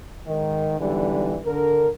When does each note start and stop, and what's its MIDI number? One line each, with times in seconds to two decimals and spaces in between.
0.27 0.76 44
0.27 0.76 51
0.79 1.39 35
0.79 1.39 44
0.79 1.39 50
0.79 1.39 52
0.79 1.39 55
1.45 1.88 50
1.45 1.88 70